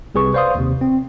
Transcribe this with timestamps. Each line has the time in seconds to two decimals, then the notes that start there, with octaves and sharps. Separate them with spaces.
0.15 C2 C3 G#4 B4 C#6
0.33 B4 C5 D5 F5 C6 D#6
0.55 D#2 C3
0.81 C4